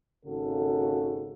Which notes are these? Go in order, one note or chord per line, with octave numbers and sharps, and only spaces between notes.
G#1 C#3 A#3 F#4 A4